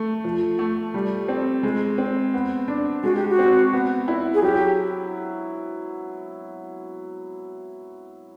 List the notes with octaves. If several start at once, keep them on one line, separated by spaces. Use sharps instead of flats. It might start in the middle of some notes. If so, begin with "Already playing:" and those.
Already playing: A3
F3
A3
G3
C4
G#3
C4
B3
D4
G#3 F#4
G4
F#4
C4
B3
E4
G#4
F#3 G4